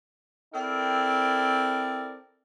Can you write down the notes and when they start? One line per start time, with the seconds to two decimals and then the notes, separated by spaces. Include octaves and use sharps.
0.53 C4 E4 A4 A#4 D5 G5